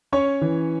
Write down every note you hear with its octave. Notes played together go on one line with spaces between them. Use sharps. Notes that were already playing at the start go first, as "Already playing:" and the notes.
C#4 C#5
E3